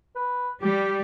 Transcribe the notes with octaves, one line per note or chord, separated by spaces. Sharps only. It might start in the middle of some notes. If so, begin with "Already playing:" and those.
B4
G3 G4